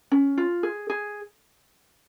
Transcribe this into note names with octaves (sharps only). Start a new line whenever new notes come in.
C#4
F4
G#4
G#4